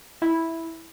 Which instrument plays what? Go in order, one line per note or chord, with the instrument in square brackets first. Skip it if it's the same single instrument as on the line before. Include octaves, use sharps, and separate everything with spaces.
[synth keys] E4